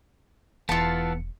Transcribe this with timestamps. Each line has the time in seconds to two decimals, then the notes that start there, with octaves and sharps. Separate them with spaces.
0.69 E1 E2 E3 B3 F4 A5 C#7